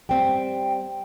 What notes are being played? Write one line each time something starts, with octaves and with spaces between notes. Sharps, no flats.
G3 C4 G5